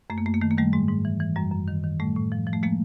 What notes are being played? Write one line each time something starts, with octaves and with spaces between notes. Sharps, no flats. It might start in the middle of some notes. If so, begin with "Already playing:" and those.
F#2 A3
A#3
F#2 A3
A#3
D#3 A3
A#3
D#3 G3 A3
G#2 G#3
G#2
E3
E3
F#2 G3
F#2
D#3
D#3
A2 G3 A3
A2
F3
F3
A3
F3 G#3 A#3